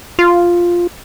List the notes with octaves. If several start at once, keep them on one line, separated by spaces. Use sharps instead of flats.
F4